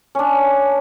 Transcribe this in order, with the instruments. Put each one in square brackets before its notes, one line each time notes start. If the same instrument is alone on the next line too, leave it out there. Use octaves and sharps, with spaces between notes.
[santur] C#4 D4